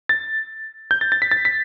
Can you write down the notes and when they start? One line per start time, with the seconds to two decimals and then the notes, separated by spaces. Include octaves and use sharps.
0.09 A6
0.91 G6
1.01 A6
1.12 A6
1.22 B6
1.31 A6
1.45 B6